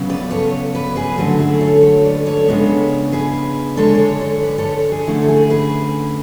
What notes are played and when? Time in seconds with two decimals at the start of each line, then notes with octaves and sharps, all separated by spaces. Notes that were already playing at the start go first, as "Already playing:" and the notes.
Already playing: C#3 F#3 B3
0.09 B4 D5
0.31 A4 C#5
0.75 B4 D5
0.96 G#4 B4
1.17 D3 F#3 A3 C#4 F#4 A4
1.39 E4 G#4
1.61 A4 C#5
1.82 A4 C#5
2.05 B4 D5
2.26 A4 C#5
2.48 C#3 E3 G#3 B3 D4
3.12 G#4 B4
3.77 D3 G#3 D4 A4 C#5
3.95 D5
3.99 A4 C#5
4.21 A4 C#5
4.42 B4 D5
4.58 A4 C#5
4.91 E4 G#4
5.07 D3 A3 C#4 E4
5.22 A4
5.28 E4 G#4
5.50 G#4 B4